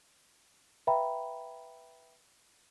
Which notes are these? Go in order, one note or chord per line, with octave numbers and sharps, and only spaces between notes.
B4 E5 F5 G5 A#5 B5